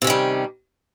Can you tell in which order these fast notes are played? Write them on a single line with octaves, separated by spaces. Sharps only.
C3 C#4 D#3 G3